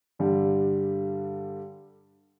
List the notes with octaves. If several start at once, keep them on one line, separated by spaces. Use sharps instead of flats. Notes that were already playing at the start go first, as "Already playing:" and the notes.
G2 D3 G3